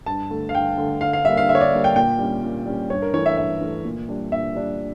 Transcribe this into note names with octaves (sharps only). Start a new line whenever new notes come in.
G2 A5
D3 A3
F5
G2 G5
D3 A3
D3 F5
F5
G3 A#3 E5
F5
D3 E5
C#5
D5
G3 A#3
G5
A#2 G5
G3 C#4
A#2
G3 C#4
G2 C#5
A#4
E3 A3 C#5
E5
G2 E5
E3 A3
A#2
G3 D4
A#2 E5
G3 D4